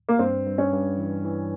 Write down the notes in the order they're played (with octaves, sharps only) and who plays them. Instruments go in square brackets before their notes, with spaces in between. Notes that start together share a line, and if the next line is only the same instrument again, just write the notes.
[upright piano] A#3
[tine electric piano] G2 [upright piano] C4
[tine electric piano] G2
[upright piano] C#4
[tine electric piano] G2
E3
E3